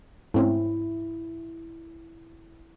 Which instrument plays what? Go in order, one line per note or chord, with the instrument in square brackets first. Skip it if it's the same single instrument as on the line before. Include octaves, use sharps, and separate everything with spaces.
[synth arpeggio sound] G#2 [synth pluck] A3 C4 C#4 [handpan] E4